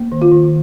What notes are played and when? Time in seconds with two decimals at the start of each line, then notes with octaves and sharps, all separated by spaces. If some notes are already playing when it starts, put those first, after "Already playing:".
Already playing: A#3
0.12 D#3
0.22 F4
0.32 D#3